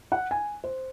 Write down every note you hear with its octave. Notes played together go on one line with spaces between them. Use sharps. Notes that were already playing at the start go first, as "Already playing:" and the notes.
F#5
G#5
C5